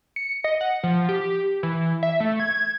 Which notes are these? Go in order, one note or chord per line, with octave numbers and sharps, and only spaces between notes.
C#7
D#5
F#5
F3
G4
E3
E5
A3
G#6